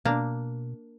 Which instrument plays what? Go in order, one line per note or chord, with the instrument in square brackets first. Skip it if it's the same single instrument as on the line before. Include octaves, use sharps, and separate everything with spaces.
[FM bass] B2 [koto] A#3 D4